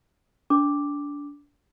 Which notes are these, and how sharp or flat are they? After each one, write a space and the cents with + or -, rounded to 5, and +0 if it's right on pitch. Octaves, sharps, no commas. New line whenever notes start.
D4 -25 D6 +0